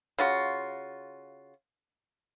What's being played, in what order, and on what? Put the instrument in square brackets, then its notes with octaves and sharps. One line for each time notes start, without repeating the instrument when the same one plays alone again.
[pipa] C#3 F4 F#4